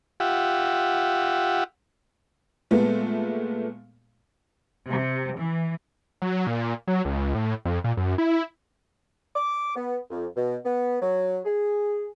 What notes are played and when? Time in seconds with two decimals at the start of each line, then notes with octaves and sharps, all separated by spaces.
0.20 F4 G4 E5 F#5
2.71 A#2 G#3 A3 B3
4.88 C3
5.37 E3
6.22 F#3
6.47 A#2
6.88 F#3
7.05 C#2
7.35 A2
7.65 F2
7.84 A#2
7.97 F#2
8.18 E4
9.35 D6
9.76 B3
10.10 F2
10.36 B2
10.65 B3
11.01 F#3
11.44 G#4